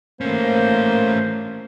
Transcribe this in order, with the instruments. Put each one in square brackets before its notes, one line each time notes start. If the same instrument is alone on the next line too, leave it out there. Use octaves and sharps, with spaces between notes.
[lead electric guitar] A3 C#4 [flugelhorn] A#3 [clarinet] C5